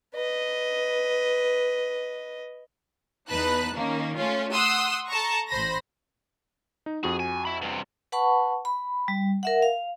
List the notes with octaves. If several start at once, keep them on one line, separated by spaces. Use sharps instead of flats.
B4 D#5
E2 D#4 B4 A5 F#6
D#3 A#3 C#4
A3 C#4 F4
F#5 C6 D#6 E6
A4 A5 A#5 C#6
A1 C5 B5 A#6
D#4
F2 F#4 G#4
G#5
E5 B5
G2 C3
B4 F#5 A5 B5 C#6
B5
G3
A#4 E5 F#5
F5